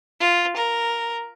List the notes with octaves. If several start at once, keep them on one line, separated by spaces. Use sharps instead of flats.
F4
A#4